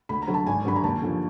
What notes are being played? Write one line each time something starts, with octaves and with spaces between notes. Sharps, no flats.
D2 B5
A#5
D3 F#3
A5
G#1 G#5
G2 D3 F#3 B5
A#5
D#2 A5
D3 F3